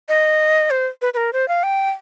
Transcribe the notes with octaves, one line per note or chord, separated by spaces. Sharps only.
D#5
C5
B4
B4
A#4
C5
F5
G5